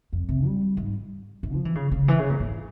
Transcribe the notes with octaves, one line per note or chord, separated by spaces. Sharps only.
F2
C3
G3
G#2
G#2
F3
E3
C#3
C#3
E3
C#3
A#2
G#2